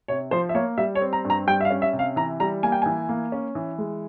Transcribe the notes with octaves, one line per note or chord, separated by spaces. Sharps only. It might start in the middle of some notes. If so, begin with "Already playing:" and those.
C3 C#5
F3 C5
E5
A#3 C#5
G3 E5
C#5
C4
A#5
G2
A#5
G3 G5
E5
F5
C#4
E5
C3
F5
E3 A#5
G3 A#5
A#3 G#5
G5
E3 G#5
A#3
C#4
E3
G#3